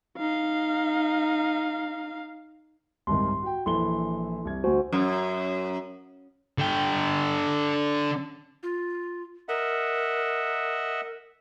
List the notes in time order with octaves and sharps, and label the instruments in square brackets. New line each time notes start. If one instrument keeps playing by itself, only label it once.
[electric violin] D#4 F5
[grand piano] C2 G#2 D#3 [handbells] C6
[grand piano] F#4 G5
[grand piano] A#1 E3 G7 [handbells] E4 A4 C6
[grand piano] C2 G#6
[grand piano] D2 G#5 [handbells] F#4 C5
[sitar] F#2
[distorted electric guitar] D3 G5
[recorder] F4
[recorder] A#4 [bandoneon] D#5 E5 F#5